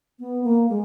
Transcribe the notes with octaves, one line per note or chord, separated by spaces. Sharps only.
B3
A#3
G#3